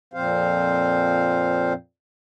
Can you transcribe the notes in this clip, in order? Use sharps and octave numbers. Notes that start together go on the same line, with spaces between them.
F2 A#2 F3 C4 C5 F5